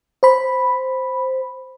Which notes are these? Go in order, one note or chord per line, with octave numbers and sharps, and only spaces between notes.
C5 B5